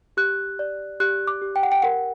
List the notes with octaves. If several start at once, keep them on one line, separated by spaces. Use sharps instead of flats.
G4 F#6
D5
G4 F#6
D6
G4
G5
F#5
G5
A#4 F#5